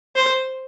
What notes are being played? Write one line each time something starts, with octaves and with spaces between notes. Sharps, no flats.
C5